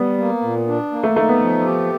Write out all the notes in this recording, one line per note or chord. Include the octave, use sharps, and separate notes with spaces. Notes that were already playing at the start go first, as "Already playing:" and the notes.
Already playing: G3 B3
A#3
A#2
D4
A#3
A3
A3 D#4
B3
F3
G4